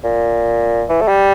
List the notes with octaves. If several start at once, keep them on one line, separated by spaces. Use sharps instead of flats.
A#2
E3
A3
G3